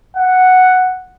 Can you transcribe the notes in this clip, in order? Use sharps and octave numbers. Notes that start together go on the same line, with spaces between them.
F#5